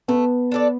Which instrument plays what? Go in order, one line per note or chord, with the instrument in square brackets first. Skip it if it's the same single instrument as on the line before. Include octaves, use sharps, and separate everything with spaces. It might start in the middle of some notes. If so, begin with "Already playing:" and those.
[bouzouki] A3 [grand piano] B3
[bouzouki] D4 A4 D5